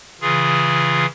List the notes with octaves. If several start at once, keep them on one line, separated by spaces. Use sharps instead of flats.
C#3 E3 F4 G#4